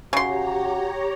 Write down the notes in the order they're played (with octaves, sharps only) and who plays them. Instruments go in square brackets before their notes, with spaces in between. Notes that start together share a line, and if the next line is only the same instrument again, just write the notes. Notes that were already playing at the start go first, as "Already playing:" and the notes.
[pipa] C#3 C6 [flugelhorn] F#4 [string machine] G4 C#5 A#5